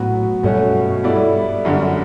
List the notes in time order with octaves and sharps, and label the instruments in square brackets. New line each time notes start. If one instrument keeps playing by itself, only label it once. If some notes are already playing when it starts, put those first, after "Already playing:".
Already playing: [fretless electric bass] A2 [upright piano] F#3 B3 F#4
[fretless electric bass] G2 [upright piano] B2 A3 C#4 F#4
[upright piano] G3 B3 E4 A4 D5
F#2 D3 G3